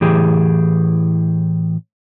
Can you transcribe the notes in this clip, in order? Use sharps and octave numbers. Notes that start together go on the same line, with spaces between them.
A2 E3 G4 G#4